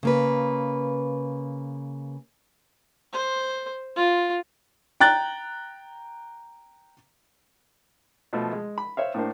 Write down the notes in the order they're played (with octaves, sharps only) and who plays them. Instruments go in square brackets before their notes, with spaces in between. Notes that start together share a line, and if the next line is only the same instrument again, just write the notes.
[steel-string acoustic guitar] C#3 A#3 B4
[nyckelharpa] C5
F4
[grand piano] G5 A#5 F#6 A6
[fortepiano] B2 F3 A3
G#3
B5
C5 C#5 E5 F5
A2 A#3 D4 C5